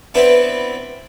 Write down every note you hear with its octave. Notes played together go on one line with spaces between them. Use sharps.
B3 C4 D4 E4 B4